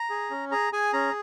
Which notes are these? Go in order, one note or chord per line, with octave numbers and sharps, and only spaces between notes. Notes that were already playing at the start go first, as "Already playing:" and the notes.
Already playing: A#5
G#4
C#4
G#4 A#5
G#4 G#5
C#4 A#5